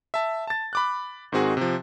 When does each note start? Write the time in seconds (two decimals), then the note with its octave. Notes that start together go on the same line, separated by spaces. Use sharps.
0.14 E5 A5
0.47 A5 A6
0.73 B5 D6 F#6
1.32 G#2 D#3 C4 F#4 G#4
1.57 C3 F3